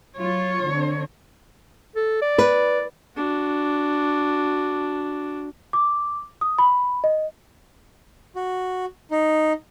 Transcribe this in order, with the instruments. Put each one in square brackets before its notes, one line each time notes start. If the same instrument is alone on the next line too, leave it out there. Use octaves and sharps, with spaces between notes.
[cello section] F#3 F4 [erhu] C#5
[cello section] D3 C4
[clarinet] A4
D5
[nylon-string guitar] B4
[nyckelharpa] D4 F#4
[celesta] D6
D#6
B5
D#5
[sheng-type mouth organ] F#4
D#4